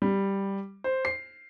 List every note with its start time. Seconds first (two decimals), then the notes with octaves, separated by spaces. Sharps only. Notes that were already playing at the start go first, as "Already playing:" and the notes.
0.02 G3
0.84 C5
1.05 C7